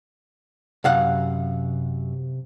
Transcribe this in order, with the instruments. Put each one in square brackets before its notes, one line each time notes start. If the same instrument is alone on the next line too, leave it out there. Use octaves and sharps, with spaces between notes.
[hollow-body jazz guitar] F#2 F5 F#5 [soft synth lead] C3